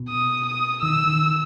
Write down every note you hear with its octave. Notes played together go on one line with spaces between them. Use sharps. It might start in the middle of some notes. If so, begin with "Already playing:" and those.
Already playing: B2
D#6
D#6
D#3 E6
D#3